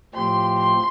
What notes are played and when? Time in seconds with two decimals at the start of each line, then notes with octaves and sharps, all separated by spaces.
0.14 A2 F3 C4 G4 C6
0.57 C6